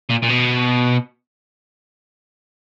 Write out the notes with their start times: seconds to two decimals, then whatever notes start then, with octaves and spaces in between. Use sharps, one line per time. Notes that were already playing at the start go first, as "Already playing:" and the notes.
0.10 A#2
0.23 A#2
0.29 B2